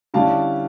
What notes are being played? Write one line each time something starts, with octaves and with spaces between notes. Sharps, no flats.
D3 G3 C#4 E4 F5 A5